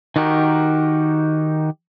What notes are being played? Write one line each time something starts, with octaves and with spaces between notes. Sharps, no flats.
D#3 D#4 F#4 G4 A#4